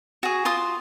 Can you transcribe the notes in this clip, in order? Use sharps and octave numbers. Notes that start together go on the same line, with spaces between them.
F#4 G#4
F4 C6 D#6